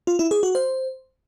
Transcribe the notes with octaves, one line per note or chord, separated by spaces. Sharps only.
F4
E4
G#4
F#4
C5